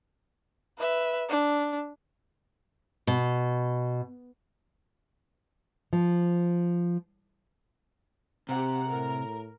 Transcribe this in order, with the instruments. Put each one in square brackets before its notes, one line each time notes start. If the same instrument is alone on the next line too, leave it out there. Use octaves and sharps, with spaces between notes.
[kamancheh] B4 E5
D4
[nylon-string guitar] B2
F3
[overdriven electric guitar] C3 [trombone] C4 [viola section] G4 F#5 [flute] A#5
[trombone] A2 [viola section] A#4